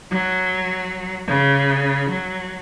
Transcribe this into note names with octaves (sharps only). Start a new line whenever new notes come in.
F#3
C#3
F#3